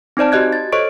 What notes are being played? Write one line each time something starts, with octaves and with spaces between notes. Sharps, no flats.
C4 D#4 C5 D5 A5
F#4 G4 D#5 F#6 G#6
A6
A4 C5 C#5 D#5 C#6 D7